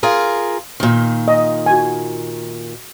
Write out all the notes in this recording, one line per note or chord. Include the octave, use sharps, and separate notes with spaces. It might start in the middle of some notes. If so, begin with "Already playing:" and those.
F4 G#4 A#4
A#2 D#3
D#5
F#4 G#5